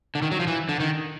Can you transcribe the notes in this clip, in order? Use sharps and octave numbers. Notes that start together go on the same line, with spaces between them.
D3
D#3
F#3
F3
E3
D3
D#3